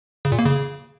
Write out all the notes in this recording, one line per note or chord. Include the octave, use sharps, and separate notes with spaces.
C#3
A#2
A#3
C#3